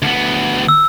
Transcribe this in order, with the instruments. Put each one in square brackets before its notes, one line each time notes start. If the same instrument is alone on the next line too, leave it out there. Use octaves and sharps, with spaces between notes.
[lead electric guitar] D2 B3
[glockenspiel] E6